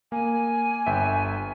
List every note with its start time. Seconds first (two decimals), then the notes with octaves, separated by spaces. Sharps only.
0.12 A#3 G#5
0.86 G1 E5 G5